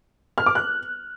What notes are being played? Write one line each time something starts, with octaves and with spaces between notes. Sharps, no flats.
F6
D6
F#6